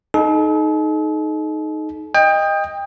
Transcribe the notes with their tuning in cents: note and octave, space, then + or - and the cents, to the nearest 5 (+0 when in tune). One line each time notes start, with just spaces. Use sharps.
D#4 +0 A4 -45
D#5 +0 G5 +25